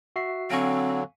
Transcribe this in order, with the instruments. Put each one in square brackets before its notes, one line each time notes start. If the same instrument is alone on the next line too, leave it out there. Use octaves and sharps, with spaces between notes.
[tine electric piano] F#4 E5 C7
[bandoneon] D3 F#3 [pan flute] C4 [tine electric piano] F5 G#5 C#6